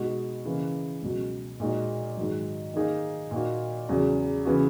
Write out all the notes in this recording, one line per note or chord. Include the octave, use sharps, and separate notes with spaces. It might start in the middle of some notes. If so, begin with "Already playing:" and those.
Already playing: B2 G#3 D#4 F#4
C#3 E3 A#3
C#2 B2 F#3 C#4
A#2 G#3 D#4 F#4
G#2 D#3 F#3
D#3 A#3 D#4 G#4
A#2 A#3 D#4 F#4
E2 C#3 F#3
C#3 E3 B3 F#4